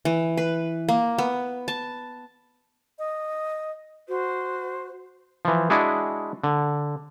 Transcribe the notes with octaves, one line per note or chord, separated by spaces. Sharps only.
E3
B4
A#3
B3
A5
D#5
F#4 C5
E3 F3
G#3 D4 E4 F#4 G#4
D3